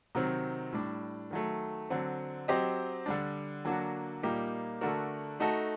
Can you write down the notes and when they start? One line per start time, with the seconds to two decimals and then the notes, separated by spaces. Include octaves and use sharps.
0.15 C3 D#3 F#3 C4
0.72 A2 G3 D4
1.31 D#3 F#3 A3
1.90 D3 F#3 C4
2.48 F#3 C4 G4 C5 D#5
3.06 D3 G3 D4
3.65 D3 F#3 A#3 D4 F#4
4.23 A#2 G3 A#3 D#4 G4
4.81 D3 A3 D4 F#4 A#4
5.40 A3 D#4 F#4 A4